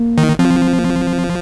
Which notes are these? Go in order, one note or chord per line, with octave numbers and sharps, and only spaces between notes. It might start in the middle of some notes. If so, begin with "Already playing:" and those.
Already playing: A#3
D#3
F3 C4
A#3
C4